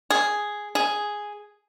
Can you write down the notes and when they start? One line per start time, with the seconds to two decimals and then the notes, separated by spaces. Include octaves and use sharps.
0.10 G#4
0.75 G#4